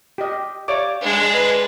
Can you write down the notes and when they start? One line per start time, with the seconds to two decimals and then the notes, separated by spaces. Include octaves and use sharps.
0.18 G4 D#5
0.68 G4 C#5 D5 E5 F5 D6
1.01 G#3 D4 G#4 E5
1.34 B4